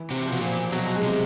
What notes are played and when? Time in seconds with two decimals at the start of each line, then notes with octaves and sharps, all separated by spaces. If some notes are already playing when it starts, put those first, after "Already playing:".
Already playing: E3
0.11 C3
0.26 F3
0.32 B2
0.41 A#2
0.72 B2 F#3
0.96 G#3
1.03 C3